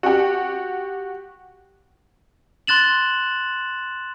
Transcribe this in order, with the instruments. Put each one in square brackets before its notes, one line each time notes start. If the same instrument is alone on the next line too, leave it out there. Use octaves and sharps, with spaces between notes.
[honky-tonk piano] F#4 G4
[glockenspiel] C6 F#6 A6 E7 F#7